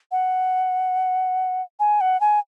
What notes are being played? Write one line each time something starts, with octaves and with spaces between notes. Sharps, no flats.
F#5
G#5
F#5
G#5